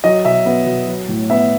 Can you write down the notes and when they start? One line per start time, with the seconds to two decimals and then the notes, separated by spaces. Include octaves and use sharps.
0.04 F#3 D#5
0.25 B2 E5
0.46 B3
0.67 B2
0.87 F#3
1.08 A2
1.30 B3 E5